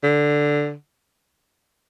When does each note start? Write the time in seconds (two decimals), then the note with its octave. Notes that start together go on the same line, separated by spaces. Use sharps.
0.04 D3